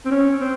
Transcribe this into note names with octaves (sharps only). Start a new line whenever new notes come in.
C4
C#4
C4